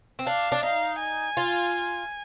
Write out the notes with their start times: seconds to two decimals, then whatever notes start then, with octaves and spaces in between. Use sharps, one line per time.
0.19 C4
0.27 D4 F5
0.52 D4
0.63 D#4 F5
1.00 G#5
1.37 F4